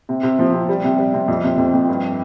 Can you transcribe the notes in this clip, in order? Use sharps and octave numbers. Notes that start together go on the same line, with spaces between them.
C3
C3
F3
C3
G3
C3
G3
C3
F2
C3
F2
F2
G2